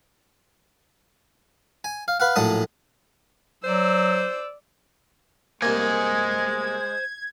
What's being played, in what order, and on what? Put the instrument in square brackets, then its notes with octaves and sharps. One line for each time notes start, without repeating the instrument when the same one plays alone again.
[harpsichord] G#5
F5
B4 F5 F#5
A#1 A2 F#3 A3 A5 D#6
[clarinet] F#3 [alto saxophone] C5 [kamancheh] D5 E6
[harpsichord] C2 A#3 [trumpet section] G#3 [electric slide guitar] C5 G#5 [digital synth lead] G#6